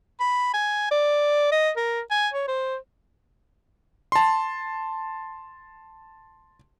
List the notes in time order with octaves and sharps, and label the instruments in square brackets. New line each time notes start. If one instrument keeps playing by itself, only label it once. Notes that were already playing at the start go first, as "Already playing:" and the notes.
[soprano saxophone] B5
G#5
D5
D#5
A#4
G#5
C#5
C5
[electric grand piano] A5 C6